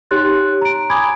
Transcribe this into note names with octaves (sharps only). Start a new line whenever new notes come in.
D#4 G4 C#5 C6 F#6 A6
A#5 D7
G#5 B5 D6 D#6 G#6